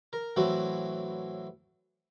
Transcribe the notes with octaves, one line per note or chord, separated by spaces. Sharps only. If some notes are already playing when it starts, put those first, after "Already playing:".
A#4
A2 E3 F#3 C4 F#4